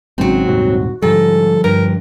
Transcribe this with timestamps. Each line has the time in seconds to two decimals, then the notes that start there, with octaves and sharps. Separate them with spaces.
0.18 G#1 G#2 C#3 F#3 C4
0.47 D#1 G#2 C3 F#4
1.02 G#2 D3 F3 G3 A4
1.64 G2 A#4